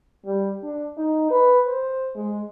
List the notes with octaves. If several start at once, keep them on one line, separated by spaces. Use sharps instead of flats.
G3
D4
D#4
B4
C5
G#3